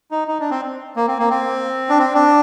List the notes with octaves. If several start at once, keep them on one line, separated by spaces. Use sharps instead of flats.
D#4
D#4
D4
C4
A#3
C4
A#3
C4
D4
C4
D4